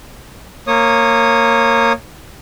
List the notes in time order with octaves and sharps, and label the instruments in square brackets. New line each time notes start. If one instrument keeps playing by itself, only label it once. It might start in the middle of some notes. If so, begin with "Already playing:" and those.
[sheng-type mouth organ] A#3 C#5 D#6